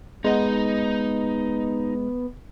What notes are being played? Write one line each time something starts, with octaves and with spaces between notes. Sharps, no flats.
G#3 B3 D#4 D#5